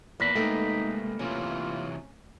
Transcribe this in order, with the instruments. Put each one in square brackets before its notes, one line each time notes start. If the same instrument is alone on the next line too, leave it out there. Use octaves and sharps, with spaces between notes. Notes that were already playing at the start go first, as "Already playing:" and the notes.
[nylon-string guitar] E2 [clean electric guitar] A#3 B4
[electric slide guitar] C3 G#3 G5 [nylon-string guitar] A3 [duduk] D#4
[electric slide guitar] C3 E3 F#3 [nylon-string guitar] C#4 [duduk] F4